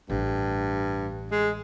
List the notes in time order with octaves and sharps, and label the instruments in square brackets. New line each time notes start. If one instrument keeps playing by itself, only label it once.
[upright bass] A1 [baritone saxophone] G2
[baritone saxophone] G#3